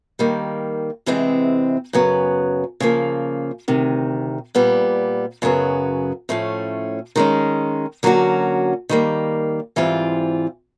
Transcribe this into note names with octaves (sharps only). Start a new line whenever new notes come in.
D#3 G3 A#3
E2 C3 E3 G#3 C4
F#2 C#3 F#3 B3
C#3 F3 A#3
D2 C3 D#3
A#2 G3 B3
F#2 C#3 F#3 B3
A2 F3 A3 C#4
D#3 G#3 C#4
D3 F#3 A#3 C#4 F#4
D#3 G3 A#3
G#2 E3 G3 C4 F4